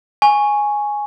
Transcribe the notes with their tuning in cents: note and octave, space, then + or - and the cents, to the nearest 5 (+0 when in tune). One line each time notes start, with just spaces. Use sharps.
G#5 +0 C#6 +0